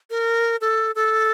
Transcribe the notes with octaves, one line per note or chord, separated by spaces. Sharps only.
A#4
A4
A4